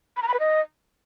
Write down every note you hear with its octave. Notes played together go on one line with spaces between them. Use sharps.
B5
A#5
B5
B4
D#5